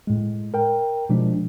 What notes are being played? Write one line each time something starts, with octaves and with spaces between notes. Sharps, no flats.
A2 G#3
A#4 G5
B2 F3 G#3 D4